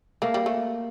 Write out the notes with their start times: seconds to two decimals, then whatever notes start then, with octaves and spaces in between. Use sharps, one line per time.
0.22 A3 A#3
0.34 G3
0.46 A3